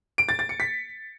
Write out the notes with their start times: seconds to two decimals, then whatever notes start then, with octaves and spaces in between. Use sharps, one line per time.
0.18 D7
0.29 A6
0.39 A6
0.49 C#7
0.60 B6